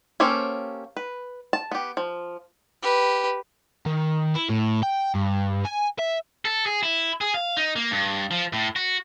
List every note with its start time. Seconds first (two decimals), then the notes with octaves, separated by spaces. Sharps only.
0.20 A#3 C#4 G4 A4 C5
0.97 B4
1.53 A5
1.71 B3 G4
1.97 F3
2.82 G4 B4
3.86 D#3
4.35 E4
4.49 A2
4.83 G5
5.15 G2
5.65 G#5
5.99 E5
6.45 A4
6.66 G#4
6.83 E4
7.21 G#4
7.34 F5
7.57 D#4
7.76 A#3
7.91 G2
8.31 F3
8.53 A2
8.76 F#4